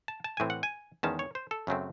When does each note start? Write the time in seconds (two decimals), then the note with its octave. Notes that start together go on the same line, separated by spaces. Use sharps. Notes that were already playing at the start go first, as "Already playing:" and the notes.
0.08 A5
0.24 A5
0.37 A2 E3 C4 G#5
0.50 F#5
0.63 G#5
1.03 E2 D#3 G#3 C#4 A5
1.19 C#5
1.35 C5
1.51 A4
1.67 F#2 C#3 F#3 A3 C4